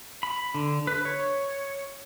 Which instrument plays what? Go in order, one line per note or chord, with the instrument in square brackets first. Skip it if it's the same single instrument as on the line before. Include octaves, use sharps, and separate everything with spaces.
[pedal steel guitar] B5
D3
B4
C#5